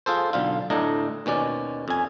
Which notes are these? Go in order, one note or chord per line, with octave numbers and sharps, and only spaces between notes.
F4 G#4 A4 C5
B1 D3 F4
D2 A2 D4 D#5 A#5
D#2 B2 C#4 D5
F2 G#5